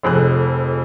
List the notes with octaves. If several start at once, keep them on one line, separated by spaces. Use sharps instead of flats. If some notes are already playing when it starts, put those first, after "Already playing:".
F1 F2 G#4 F#6